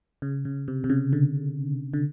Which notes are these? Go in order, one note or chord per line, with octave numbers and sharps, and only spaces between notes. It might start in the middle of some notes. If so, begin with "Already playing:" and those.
C#3
C#3
C3
C3
C#3
D3
D3